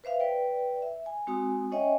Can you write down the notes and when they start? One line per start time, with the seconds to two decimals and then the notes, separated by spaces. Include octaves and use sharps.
0.04 B4 C5 E5 F5
0.20 B4 D5 G5
0.82 E5
1.06 G#5
1.27 G#3 C4 F#4 G#5 D#6
1.72 C#4 C#5 D#5 E5 G5 G#5